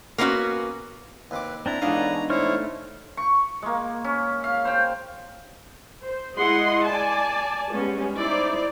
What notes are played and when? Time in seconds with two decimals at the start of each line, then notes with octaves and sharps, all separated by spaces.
0.18 A#3 B3 C#4 E4 F#4
1.31 D#2 C3 B4 D6
1.66 C4 D4 E4 A#5
1.82 E2 G#2 D4 D#4 A4 B4 C#5 F5
2.30 A3 E4 C5 C#5 C#6 F6
3.17 C#6
3.62 G#3 A#3
4.04 C#4
4.44 F5
4.65 C5 G5
6.07 C5
6.37 G#3 E4 G#4 D#5 F#5 C6
6.89 D5 G#5 A5
7.73 G3 G#3 B3 C#4
8.17 D#4 E4 C5 D5